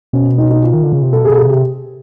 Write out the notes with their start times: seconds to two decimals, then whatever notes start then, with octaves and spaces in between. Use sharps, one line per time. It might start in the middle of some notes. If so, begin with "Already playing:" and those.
0.13 B2 C#4
0.38 D#4
0.50 D#4
0.63 F4
0.74 D#3
0.83 D3
0.93 C#3
1.02 C3
1.12 B2 A4
1.25 G#4
1.30 B2 A4
1.38 G#4
1.46 C3 G4